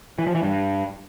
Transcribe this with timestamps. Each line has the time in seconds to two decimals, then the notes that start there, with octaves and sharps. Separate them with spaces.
0.19 E3
0.27 F3
0.35 E3
0.43 G2